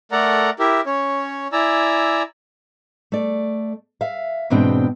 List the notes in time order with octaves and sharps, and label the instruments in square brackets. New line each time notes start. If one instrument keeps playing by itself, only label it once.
[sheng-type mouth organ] A3 A4 A#4 D5 F#5 A#5
E4 G4 A#4 E5
C#4 C#5
E4 D5 G#5 A#5 E6
[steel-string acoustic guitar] A3 D5
E5 F5
E2 G#2 B2 C4 D4 G5